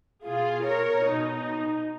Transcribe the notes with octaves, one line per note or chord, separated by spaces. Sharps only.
B2 F4 G#4
A#4 C#5
B2 D#4